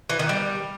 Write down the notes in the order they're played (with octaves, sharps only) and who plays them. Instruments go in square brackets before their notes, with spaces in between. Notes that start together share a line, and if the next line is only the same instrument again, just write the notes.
[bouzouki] E3
D#3
G3